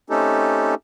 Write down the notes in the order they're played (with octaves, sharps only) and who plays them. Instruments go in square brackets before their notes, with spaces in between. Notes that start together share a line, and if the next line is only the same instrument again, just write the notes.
[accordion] A3 C4 C#4 D#4 G4 A4